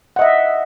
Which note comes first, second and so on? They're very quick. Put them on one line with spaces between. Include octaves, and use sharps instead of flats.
F#5 D#5 E5